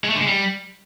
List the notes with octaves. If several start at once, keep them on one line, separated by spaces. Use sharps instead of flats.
G#3
A3
D3
G#3
G3